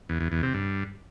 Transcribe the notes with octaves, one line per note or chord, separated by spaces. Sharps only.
E2
E2
E2
C3
G2